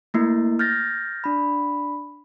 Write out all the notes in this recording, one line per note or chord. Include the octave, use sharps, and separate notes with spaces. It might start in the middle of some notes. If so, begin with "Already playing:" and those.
A3 A#3 E4
F6 G6 A6 A#6
D4 B5